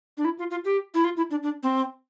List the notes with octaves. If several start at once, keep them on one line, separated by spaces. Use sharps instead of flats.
D4
E4
F4
F4
G4
E4
F4
E4
D4
D4
C4